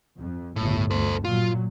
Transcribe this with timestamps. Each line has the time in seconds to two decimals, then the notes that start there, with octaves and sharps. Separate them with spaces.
0.18 F2
0.56 G1 C#2 A2
0.91 D2 A4 C5
1.25 A#2 F#3 F4